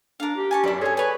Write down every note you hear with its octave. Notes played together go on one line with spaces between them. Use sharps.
D4 A#4 F5
G4
G#5 A5 C#6
F#2 E4 B4 D5
G#4 A4 C#5 G#5 C6
B4 C#5 G#5